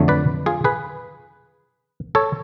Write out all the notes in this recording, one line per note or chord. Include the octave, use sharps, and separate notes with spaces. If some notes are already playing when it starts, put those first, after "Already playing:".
Already playing: F2 D3 F#3 A3
B4 D5
F4 G#4
G#4 B4
A4 C#5